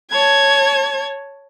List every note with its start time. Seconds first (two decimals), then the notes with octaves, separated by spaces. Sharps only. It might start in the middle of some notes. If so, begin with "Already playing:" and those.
0.11 C#5 A5 G#6